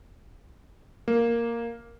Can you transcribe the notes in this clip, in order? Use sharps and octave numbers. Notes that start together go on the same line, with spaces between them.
A#3